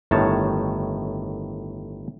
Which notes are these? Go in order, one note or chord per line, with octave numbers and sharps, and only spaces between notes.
G1 A2 D#3 C#5 A5